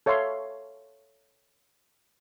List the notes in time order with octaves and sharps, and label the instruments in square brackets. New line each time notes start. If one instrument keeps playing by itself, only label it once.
[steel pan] A4 C#5 E5 F5 C6